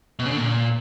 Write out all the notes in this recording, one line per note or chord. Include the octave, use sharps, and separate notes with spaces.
B2
C#3
D3
A#2